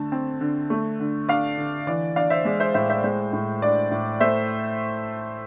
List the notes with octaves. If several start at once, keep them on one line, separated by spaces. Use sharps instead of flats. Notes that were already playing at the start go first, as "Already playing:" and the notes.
Already playing: D3 A3 A5
C4
D3
A3
D3
D4 D5 F5
D3
E3 D5
D4 D5 F5
C5 E5
G#3 D5
C5 E5
A2 C5 E5
C5 E5
G#3 C5
A2
D4 D5
A2
A3 C5 E5